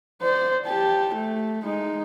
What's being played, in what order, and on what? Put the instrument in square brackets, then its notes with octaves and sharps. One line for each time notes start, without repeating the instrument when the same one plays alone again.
[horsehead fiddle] C5 D5
G4 A5
A3
G#3 D#4